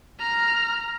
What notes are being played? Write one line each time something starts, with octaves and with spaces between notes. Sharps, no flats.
A#5 F6